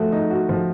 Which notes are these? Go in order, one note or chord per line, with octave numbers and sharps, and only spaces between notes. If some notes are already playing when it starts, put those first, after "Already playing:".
Already playing: F3 A3 F#4
D#4
F#4
F3